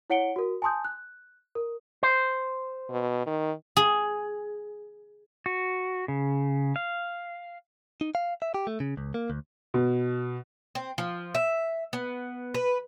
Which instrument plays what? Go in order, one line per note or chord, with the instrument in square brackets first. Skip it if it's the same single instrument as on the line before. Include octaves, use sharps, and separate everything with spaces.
[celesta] E4 C#5 F#5 C#7 D7 G7
F#4 A#4
G#5 A5 C6 D#6 G6
F#6
A#4
[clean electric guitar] C5
[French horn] B2
D#3
[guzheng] G#4
[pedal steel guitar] F#4
C#3
F5
[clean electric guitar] D#4
F5
E5
G4
A3
C#3
C#2
A#3
D2
[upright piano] B2
[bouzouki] C4
F3
E5
B3
B4